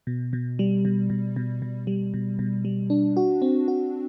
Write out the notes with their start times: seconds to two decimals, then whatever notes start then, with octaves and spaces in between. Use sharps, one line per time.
0.07 B2
0.33 B2
0.59 G3
0.85 B2
1.10 B2
1.36 B2
1.62 B2
1.87 G3
2.14 B2
2.39 B2
2.65 G3
2.90 D4
3.17 F#4
3.42 C4
3.68 F#4